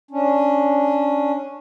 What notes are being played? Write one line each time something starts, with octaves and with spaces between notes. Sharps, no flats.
C#4 D4